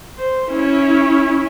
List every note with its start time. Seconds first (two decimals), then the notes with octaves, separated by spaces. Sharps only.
0.18 C5
0.51 C#4 E4